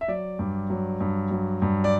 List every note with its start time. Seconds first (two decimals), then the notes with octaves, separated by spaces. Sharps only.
0.01 E5
0.08 F#3 D5
0.39 G2
0.70 F#3
1.00 G2
1.31 F#3
1.62 G2
1.84 D5